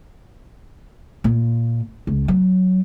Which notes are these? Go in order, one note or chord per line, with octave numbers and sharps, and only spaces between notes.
A#2
C#2
F#3